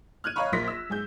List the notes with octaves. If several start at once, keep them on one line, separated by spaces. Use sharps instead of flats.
F6 F#6 G#6 D#7
C#5 D#5 F5 A#5 B5 C#6
A#1 A#3 C6 A#6 B6
E6
G#2 G#4 G6